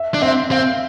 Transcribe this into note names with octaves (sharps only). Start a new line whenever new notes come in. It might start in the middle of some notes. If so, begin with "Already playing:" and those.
Already playing: E5
D4
C4 E5
C4 F5